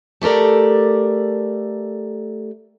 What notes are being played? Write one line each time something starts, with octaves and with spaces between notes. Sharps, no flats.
A3 G4 A4 A#4 D5